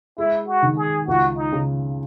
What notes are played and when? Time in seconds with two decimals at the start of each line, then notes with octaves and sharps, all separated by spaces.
0.18 G#3 E4
0.48 F#4
0.63 D#3
0.77 G#4
1.07 C#2 F#4
1.37 D#4
1.52 C#3